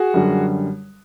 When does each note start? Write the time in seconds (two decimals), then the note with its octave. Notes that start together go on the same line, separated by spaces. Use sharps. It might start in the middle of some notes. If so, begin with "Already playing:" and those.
Already playing: F#4 G#4
0.14 F#2 D3 G3